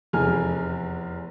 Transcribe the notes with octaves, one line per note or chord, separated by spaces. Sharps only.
F1 E2 G#4 F6